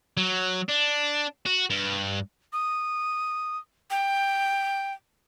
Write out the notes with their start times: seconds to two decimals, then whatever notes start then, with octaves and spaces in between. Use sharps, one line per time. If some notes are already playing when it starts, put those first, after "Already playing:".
0.17 F#3
0.69 D4
1.46 F#4
1.70 G2
2.53 D#6
3.91 G5